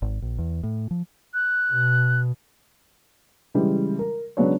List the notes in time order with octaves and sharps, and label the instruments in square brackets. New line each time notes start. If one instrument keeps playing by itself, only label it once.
[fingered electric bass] G#1
A#1
E2
A2
F3
[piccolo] F#6
[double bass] B2
[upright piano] C#3 E3 G3 G#3
A#4
C#3 F#3 G#3 B3 D4 C#5